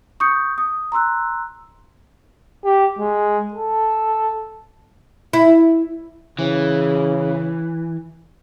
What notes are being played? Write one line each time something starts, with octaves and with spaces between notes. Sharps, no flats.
C#6 D#6 G6 C#7
D#6
A#5 C6 E6 F#6
G4
G#3
A4
E4
C#3 E3